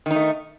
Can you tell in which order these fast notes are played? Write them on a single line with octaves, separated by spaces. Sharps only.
D#3 D#4 A3